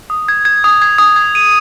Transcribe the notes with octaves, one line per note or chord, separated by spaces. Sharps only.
D#6
G#6
G#6
D#6
G#6
D#6
G#6
D#7